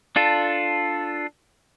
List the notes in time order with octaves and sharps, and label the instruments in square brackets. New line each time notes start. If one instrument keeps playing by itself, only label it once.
[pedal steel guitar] D4 F4 A4